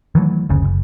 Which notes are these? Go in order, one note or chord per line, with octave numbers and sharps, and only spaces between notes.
D#3 E3 F#3 A3
F#1 D2 C#3
F#1